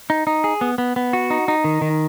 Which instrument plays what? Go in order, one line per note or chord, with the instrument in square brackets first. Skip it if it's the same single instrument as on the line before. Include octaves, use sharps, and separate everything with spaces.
[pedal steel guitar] D#4
D#4
G#4
B3
B3
B3
F#4
D#4
D#4
D#3
D#3